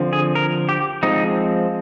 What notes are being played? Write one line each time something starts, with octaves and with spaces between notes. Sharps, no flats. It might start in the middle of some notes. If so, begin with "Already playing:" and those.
Already playing: D3 F3 C4
G#4
A#4
G4
F3 G#3 C4 D#4